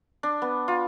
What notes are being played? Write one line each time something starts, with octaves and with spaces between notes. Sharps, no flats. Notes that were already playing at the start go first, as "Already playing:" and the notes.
D4
B3
F4